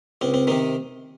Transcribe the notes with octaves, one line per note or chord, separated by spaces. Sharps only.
C#2 C4
C4
C3 D#3 C4